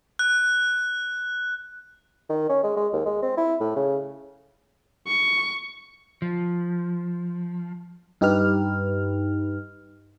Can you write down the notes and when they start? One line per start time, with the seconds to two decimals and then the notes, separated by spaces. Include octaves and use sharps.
0.19 F#6
2.30 D#3
2.49 C#4
2.64 G#3
2.77 G#3
2.93 D#2
3.06 G#3
3.22 C4
3.38 E4
3.61 A2
3.76 C#3
5.07 C#6
6.22 F3
8.21 G2 D#4 G4 B4 F6